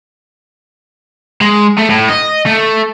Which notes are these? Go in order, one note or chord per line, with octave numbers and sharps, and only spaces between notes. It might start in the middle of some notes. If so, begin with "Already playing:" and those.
G#3
A3
A2
D#5
A3